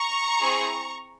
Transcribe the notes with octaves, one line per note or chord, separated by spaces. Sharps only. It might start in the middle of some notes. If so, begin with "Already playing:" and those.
Already playing: A#5 C#6
C4 E4 G#4